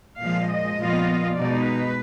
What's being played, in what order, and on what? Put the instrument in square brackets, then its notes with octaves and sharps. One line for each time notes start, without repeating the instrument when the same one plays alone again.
[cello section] A#2 F3 G#3 F5
D#5
A#2 F3 B3 F4
B2 G#3 D#4 D5
B4